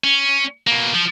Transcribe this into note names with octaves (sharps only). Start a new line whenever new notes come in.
C#4
B2 A#3
F3